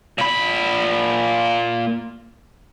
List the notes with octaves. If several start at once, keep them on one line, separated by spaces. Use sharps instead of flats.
A#2 B5